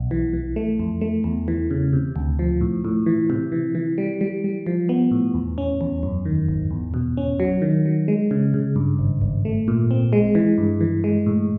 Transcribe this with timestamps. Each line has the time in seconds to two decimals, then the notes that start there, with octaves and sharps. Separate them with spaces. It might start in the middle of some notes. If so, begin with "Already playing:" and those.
Already playing: B1
0.11 E3
0.33 E3
0.56 A3
0.80 F2
1.01 A3
1.24 E2
1.48 E3
1.71 C#3
1.93 C3
2.16 D2
2.39 F3
2.61 A2
2.84 A2
3.06 E3
3.30 C3
3.52 E3
3.75 E3
3.98 G3
4.21 G3
4.44 G3
4.66 F3
4.89 B3
5.11 A2
5.34 E2
5.58 C#4
5.81 E2
6.03 F#2
6.25 D#3
6.48 G#1
6.71 E2
6.94 B2
7.17 C#4
7.40 F#3
7.62 D#3
7.86 F#3
8.08 G#3
8.31 C#3
8.54 C#3
8.76 G2
8.99 G#1
9.21 G#1
9.45 A3
9.68 A#2
9.91 C4
10.13 G#3
10.35 E3
10.58 G2
10.81 E3
11.04 G#3
11.26 A2